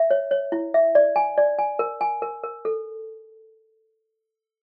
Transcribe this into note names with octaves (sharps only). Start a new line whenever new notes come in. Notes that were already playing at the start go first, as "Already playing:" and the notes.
Already playing: E5
C#5
C#5
E4
E5
D5
G#5
D5
G#5
A#4
G#5
A#4
A#4
A4